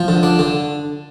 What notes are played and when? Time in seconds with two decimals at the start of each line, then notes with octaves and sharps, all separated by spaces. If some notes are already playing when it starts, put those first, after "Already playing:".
Already playing: F3
0.08 D3
0.23 D4
0.39 D3